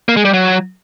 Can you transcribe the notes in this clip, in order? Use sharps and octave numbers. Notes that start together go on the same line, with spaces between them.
A#3
G#3
G3
F#3